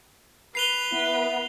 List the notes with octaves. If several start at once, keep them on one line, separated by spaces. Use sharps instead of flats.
B4 C7 F7 G7
B3 E4